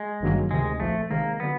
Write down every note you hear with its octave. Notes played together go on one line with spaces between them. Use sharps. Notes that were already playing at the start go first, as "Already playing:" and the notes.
Already playing: G#3
G#1 G2 D#3 F#3 A#3
D2 C3 D#3 G#3
A#1 A#2 F3 A3
C3 D#3 G#3 A#3
D3 F#3 B3